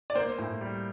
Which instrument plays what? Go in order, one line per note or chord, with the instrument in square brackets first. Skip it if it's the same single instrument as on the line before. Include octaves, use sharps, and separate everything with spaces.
[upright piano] D5
[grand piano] A#3 [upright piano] C5
[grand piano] A2
G3